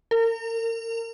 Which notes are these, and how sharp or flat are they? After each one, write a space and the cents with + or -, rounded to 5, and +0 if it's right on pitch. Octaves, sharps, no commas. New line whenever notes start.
A#4 -35